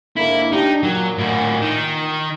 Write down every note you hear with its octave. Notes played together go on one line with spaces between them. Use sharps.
G#2 D3 A#3 E4
D4 D#4 G4
A#2 F#3
A2 F#4
D#3